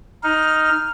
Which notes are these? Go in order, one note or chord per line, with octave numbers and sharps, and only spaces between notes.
D#4 F6